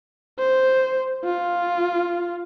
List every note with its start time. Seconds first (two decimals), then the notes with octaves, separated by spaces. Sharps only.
0.39 C5
1.25 F4